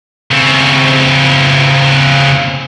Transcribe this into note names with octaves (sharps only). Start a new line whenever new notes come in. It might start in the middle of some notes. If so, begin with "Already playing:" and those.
C#3 C4